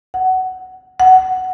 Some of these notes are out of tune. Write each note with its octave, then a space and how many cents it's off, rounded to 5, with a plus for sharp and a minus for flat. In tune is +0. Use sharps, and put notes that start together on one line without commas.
F#5 +15
F#5 +10